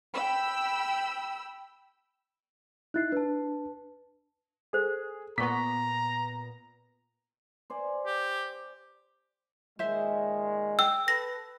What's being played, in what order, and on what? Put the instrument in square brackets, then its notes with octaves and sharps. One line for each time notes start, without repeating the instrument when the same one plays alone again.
[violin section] G5 B5 E6
[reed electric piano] D#4 E4 [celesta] F#6 A6 C7
[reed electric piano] D4 [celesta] B4 A5
[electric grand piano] G#4 [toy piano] A4 C5
[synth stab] A#2 B3 [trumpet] A#5 [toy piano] C#6 D6 [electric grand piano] B6
[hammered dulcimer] C5 D5 G#5
[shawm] G4
[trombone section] A#2 D#3 G#3 [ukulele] C5 E5
[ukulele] G5 [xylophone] E6
[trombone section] A4 B4 [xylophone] A#6